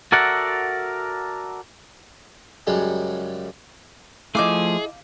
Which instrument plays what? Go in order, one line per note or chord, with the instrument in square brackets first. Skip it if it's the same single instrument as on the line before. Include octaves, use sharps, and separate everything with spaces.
[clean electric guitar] F#4 A4 A#4 D5 E5 F#5
[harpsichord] F#2 C#3 G3 G#3
[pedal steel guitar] F3 A3 [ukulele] E4 D#5 [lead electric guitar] G#4 [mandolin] F5 D6 G6